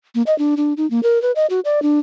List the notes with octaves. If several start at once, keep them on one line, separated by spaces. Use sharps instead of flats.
A#3
D#5
D4
D4
D#4
A#3
A#4
B4
D#5
F#4
D5
D4